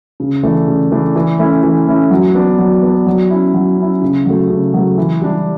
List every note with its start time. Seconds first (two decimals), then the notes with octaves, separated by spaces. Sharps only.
0.20 C#3
0.43 E3 A3 D4
0.68 C#3
0.92 E3 A3 D4
1.15 E3
1.39 A3 C#4 E4
1.63 E3
1.87 A3 C#4 E4
2.11 F#3
2.35 B3 D4
2.58 F#3
2.82 B3 D4
3.06 F#3
3.30 C#4 E4
3.54 F#3
3.78 C#4 E4
4.02 C#3
4.26 F#3 A3
4.50 C#3
4.74 F#3 A3
4.98 E3
5.21 G3 D4